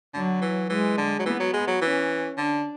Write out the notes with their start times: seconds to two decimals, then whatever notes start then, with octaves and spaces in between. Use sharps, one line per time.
0.14 D3 F#3
0.41 E3
0.70 E3 G#3
0.98 D3
1.19 F#3
1.26 E3 B3
1.40 F#3
1.53 G#3
1.67 F#3
1.81 E3 C#4
2.37 D3 D4